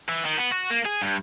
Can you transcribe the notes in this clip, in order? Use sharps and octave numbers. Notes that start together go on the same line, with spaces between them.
E3
D#3
B3
F#4
A#3
G#4
G2